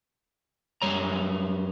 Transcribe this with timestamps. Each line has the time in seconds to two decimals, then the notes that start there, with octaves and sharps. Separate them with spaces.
0.82 F#2 G3 C#5 A#5